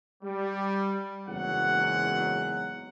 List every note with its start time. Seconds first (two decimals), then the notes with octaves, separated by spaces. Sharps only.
0.23 G3
1.28 F#1 E2 G#2 F#3 G#4 F#5